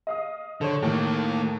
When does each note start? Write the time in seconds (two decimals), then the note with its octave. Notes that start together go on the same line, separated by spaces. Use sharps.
0.07 D#5 F5 D#6
0.61 D3 A4 C5 C#5
0.83 A2 D#3 A#3